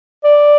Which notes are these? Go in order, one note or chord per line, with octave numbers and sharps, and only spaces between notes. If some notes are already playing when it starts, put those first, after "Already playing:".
D5